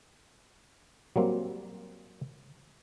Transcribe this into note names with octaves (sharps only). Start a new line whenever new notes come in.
F#3 G3 A#3 C4